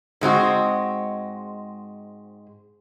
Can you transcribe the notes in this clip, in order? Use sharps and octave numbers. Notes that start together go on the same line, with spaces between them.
G#2 G#3 C4 F#4